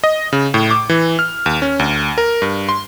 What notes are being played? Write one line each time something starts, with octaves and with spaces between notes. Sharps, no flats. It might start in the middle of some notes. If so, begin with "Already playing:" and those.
D#5
C#3
A2
D6
E3
F6
D#2
C#4
D2
A#4
G2
C6